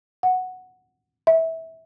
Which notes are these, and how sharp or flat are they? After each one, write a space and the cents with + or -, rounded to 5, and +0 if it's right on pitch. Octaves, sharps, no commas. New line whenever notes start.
F#5 -5
E5 -20